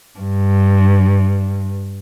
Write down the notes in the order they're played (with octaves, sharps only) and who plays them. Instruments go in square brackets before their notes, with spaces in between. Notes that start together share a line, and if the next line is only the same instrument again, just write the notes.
[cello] G2